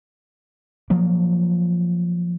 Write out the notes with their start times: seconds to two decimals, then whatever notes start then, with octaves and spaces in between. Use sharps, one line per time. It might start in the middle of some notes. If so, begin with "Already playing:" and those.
0.90 F3 F#3 A#3